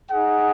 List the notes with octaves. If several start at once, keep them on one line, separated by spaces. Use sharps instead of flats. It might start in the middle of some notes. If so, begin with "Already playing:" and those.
D#4 G#4 F#5